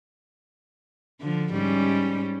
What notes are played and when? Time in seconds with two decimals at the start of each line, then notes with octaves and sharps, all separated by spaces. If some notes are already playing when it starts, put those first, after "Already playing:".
1.21 D3 F3
1.53 G#2 G3 C#4